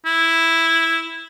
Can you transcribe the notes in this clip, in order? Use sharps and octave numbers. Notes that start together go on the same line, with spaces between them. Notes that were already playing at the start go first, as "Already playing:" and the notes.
E4